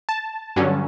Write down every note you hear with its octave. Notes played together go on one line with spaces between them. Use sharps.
A5
G2 D3 F#3 C#4